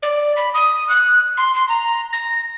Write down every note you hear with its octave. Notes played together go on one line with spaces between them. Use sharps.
D5
B5
D#6
F#6
C6
C6
A#5
A#6